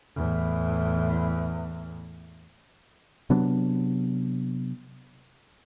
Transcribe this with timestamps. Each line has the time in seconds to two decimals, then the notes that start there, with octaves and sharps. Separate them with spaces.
0.16 E2 A2
3.30 C3 F#3 B3 D4